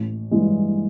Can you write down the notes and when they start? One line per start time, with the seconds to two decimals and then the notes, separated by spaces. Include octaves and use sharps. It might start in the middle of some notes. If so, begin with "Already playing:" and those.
Already playing: A1
0.31 G2 E3 G#3